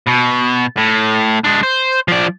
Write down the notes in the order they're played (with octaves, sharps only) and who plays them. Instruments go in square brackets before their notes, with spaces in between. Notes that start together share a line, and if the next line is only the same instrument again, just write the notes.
[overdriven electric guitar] B2
A2
G#3 D4
C5
F3 D5